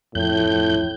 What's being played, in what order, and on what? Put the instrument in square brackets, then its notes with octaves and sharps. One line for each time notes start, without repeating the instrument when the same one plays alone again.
[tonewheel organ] F2 G6 [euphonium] A2